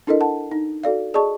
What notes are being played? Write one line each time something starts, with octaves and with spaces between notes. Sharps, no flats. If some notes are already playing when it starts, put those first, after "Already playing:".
D4 E4 A4 A#4 D#5
F#5 A5
D#4
F#4 A4 D5 F5
G#4 D5 D#5 A5 C#6